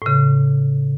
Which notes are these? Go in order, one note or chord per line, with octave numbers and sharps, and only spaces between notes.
A2 C#3